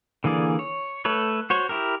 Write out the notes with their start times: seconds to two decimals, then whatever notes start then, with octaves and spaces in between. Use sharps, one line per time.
0.24 D3 E3 A#3 G#4 D5
0.59 C#5
1.05 A3 A4 B4 C#5
1.50 F#4 C5 C#5
1.69 E4 G4 A#4